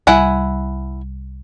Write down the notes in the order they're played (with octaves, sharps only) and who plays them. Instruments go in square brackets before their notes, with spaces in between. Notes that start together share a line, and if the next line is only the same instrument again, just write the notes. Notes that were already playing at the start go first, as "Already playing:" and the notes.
[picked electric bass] C2 G3 [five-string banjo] E4 F#5 G#5